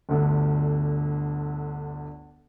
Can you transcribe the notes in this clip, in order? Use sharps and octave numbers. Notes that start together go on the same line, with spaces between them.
G1 D2 D3